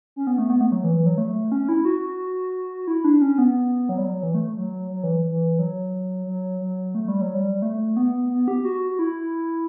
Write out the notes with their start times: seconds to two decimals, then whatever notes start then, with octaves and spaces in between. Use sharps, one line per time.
0.16 C#4
0.27 B3
0.38 A3
0.50 B3
0.61 A3
0.72 F#3
0.84 E3
0.95 E3
1.06 F#3
1.18 A3
1.52 C#4
1.69 E4
1.85 F#4
2.87 E4
3.04 D4
3.22 C#4
3.38 B3
3.89 F#3
3.98 G3
4.05 F#3
4.23 E3
4.35 A3
4.57 F#3
4.91 F#3
5.03 E3
5.29 E3
5.59 F#3
6.27 F#3
6.61 F#3
6.95 A3
7.08 G3
7.21 F#3
7.34 G3
7.55 G3
7.62 A3
7.97 B3
8.31 B3
8.48 G4
8.65 F#4
8.91 F#4
8.99 E4